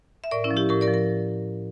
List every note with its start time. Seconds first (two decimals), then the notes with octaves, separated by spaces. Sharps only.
0.24 E5
0.31 A2 A#4 D5
0.44 C#4 E4
0.51 F3
0.57 E4 G4
0.69 A2 G4 A#4
0.81 A#4 D5
0.88 F3
0.94 A#4